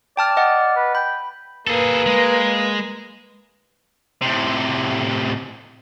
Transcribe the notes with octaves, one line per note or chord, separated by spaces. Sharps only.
D5 G5 A5 F6
D#5 F#5 F6
B4
G5 B5
A#3 G#4 A4 B4
G#3
A2 C3